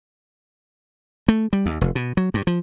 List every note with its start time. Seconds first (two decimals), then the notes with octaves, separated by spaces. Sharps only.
1.28 A3
1.53 G3
1.66 D#2
1.81 F1
1.95 B2
2.17 F#3
2.34 G2
2.47 F3